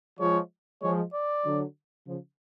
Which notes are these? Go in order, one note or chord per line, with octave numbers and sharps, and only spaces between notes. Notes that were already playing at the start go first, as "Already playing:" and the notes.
F3 G#3 C#5
F3 G#3 C#5
D5
D3 F#3
C#3 F3